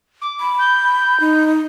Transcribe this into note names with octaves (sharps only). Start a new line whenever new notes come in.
D6
B5
G6
D#4